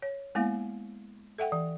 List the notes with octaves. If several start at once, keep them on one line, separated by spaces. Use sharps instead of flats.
C#5
G#3 A#3 B3 E4 F5
A4 E5 F#5 G5
E3